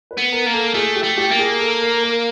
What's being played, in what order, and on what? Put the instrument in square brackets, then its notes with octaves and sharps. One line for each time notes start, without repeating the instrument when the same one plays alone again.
[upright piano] B4
[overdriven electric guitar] B3
[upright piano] A#4
[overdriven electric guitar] A#3
[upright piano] A4
[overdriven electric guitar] A3 [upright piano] G#4
[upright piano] G4
[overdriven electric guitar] A3
[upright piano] G4
[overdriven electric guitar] A#3
[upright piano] G#4
A4
A#4
A#4